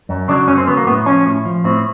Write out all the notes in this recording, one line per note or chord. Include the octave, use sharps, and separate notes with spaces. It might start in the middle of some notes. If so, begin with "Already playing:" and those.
F#2
C#3 F#3 D4
F#2 C#4
C4
C#3 F#3 B3
A#3
A2 B3
F3 C#4
A2
F3
A2 C4